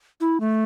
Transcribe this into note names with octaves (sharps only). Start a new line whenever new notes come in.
E4
A3